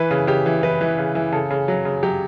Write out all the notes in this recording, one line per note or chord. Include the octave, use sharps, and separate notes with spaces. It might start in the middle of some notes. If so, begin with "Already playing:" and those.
Already playing: E3 B4
C#3
C#3 G4
E3
E3 B4
E3
C#3
E3
C#3 A4
C#3
F#3
C#3
F#3 G4